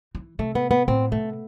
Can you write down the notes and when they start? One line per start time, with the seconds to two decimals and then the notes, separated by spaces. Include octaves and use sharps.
0.15 E3
0.39 C3 A3
0.55 B3
0.71 B3
0.88 A2 C4
1.12 C3 A3